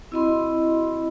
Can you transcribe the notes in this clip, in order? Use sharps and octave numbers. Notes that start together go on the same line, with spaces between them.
C4 E4 F#4 D#5 B5 C6